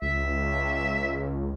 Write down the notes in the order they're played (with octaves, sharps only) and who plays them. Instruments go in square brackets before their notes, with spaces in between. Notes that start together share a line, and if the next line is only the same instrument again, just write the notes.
[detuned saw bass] C#2 [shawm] E5